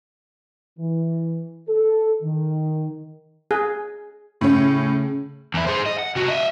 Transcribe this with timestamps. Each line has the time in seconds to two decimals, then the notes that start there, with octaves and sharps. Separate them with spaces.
0.79 E3
1.68 A4
2.23 D#3
3.51 G#4
4.41 A2 C#3 C#4
5.54 E2 E4
5.67 G#4 C5
5.86 D#5
5.98 F#5
6.15 C3 F#4
6.28 D#5 E5